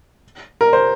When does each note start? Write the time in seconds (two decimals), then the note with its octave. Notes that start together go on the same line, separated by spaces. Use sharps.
0.61 A#4
0.73 C5